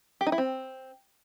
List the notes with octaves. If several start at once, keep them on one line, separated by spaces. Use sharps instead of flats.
G4
D#4
E4
C4